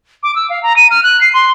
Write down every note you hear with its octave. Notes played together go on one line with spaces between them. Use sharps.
D6
E6
F5
A#5
D#7
F6
F#6
C7
C6